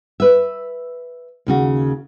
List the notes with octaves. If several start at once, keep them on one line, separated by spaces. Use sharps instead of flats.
B4 E5
D#2 C#3 F#4